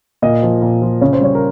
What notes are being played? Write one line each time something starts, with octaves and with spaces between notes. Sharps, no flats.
A#2 D#5
F3
A#2
F3
C#3 C#5
C5
G3 C#5
A#4